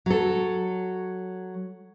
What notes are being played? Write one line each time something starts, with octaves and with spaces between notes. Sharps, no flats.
F#3 A4